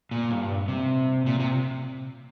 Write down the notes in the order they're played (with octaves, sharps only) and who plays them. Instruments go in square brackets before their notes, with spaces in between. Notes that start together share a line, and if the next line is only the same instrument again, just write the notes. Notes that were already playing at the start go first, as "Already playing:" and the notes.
[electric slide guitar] A#2
G2
C3
A#2
C3